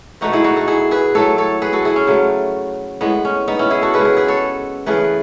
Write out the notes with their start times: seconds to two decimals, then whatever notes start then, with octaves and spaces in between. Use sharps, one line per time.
0.21 B2 A3 D#4 F#4
0.33 E4 G#4
0.44 D#4 F#4
0.56 F#4 A4
0.67 E4 G#4
0.91 G#4 B4
1.14 A2 F#3 A3 A4 C#5
1.38 A4 C#5
1.62 G#4 B4
1.73 F#4 A4
1.85 E4 G#4
1.96 C#4
2.07 C#3 F#3 A3
3.01 A2 G#3 B3
3.25 C#4
3.48 B3 D#4
3.59 C#4 E4
3.70 E4 G#4
3.82 F#4 A4
3.94 C#3 G#3 G#4 B4
4.05 G#4 B4
4.17 G#4 B4
4.28 A4 C#5
4.86 C#3 E3 A3 G#4 B4